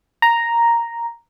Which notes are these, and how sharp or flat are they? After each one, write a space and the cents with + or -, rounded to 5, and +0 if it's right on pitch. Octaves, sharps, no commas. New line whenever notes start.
A#5 +0